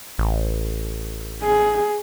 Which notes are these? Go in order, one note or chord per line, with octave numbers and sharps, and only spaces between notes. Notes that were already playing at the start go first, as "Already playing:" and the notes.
A1
G#4